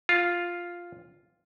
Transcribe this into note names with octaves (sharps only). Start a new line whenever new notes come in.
F4